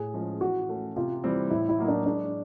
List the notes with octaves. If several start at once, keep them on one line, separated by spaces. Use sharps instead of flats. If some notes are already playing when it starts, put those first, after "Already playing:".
Already playing: A2 G#4
F3 G#3 C#4
E3 F#4
A3 C#4
C3 F4
E3 G3 C4
A2 E4
E4
F#3 A#3 D#4
D4
G#3 D4